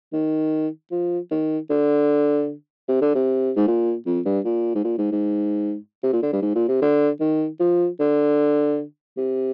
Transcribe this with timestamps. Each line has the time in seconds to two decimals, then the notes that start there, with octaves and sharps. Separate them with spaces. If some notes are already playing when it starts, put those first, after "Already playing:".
0.13 D#3
0.91 F3
1.31 D#3
1.70 D3
2.89 C3
3.01 D3
3.15 C3
3.56 G#2
3.67 A#2
4.06 F2
4.26 G2
4.45 A#2
4.75 G#2
4.84 A#2
4.98 G#2
5.12 G#2
6.03 C3
6.13 A#2
6.23 D3
6.33 G2
6.42 G#2
6.55 A#2
6.68 C3
6.82 D3
7.20 D#3
7.60 F3
8.00 D3
9.17 C3